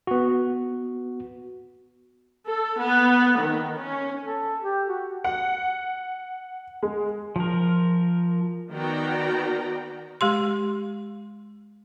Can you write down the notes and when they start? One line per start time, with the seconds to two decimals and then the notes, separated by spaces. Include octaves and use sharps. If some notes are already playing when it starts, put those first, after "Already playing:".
0.07 B3 F#4
2.46 A4
2.79 B3
3.38 D#3
3.78 C#4
4.24 A4
4.63 G4
4.89 F#4
5.24 F#5
6.83 G#3
7.36 F3 A#4
8.71 D#3 B3 F#4 D5 G5 A#5
10.21 G#3 G4 C6